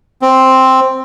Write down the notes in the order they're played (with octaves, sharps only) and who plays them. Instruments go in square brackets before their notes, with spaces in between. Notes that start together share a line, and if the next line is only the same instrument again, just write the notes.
[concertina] C4